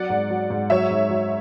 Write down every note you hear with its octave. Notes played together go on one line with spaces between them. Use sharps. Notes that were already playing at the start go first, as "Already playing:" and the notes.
Already playing: F#3 D5 F#5
G#2
F#3
G#2
F#3 C#5 E5
G#2
F#3